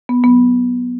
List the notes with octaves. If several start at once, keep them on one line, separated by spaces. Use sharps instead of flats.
B3
F#3 B3